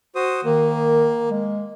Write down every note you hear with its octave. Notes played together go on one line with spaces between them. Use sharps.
F#4 C5 D#6
D#3 A#3
G#3